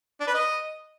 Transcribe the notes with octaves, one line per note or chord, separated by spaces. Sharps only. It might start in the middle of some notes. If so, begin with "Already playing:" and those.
D4
B4
D#5